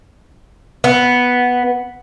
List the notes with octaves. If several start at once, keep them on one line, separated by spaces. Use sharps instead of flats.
B3